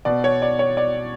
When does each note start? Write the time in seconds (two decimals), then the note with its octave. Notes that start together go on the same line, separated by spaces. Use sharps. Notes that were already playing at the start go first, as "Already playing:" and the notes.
0.05 B2 D5
0.24 C#5
0.42 D5
0.59 C#5
0.77 D5